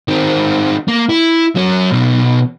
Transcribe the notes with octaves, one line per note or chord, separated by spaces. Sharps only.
D#3 C4
A#3
E4
F#3 C#4
B1 B2